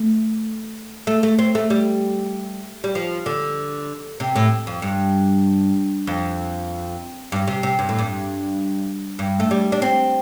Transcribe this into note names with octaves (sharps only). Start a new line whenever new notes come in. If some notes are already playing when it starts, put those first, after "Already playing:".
Already playing: A3
A3
A3
C4
A3
G3
G3
F3
D3
C3
A2
F2
G2
F2
G2
C3
C3
G2
A2
G2
G2
A3
G3
D4
C4